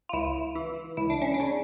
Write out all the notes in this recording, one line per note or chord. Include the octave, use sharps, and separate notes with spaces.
F4
C#2 E4
E3
C#2 E4
D4
C#4
D4
C#3